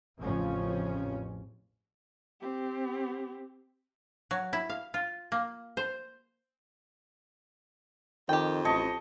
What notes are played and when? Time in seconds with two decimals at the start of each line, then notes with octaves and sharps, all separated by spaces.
0.18 A1 F2 A2 C#3 F3 C#4
2.41 C4 G4
4.31 F#3
4.53 E4
4.70 F5
4.94 F4
5.32 A#3
5.77 C5
8.29 F2 D#3 G4 G5
8.65 A1 D#5 A5 C#6